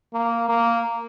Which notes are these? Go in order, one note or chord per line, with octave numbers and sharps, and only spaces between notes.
A#3
A#3